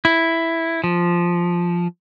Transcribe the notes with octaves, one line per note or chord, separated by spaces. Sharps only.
E4
F3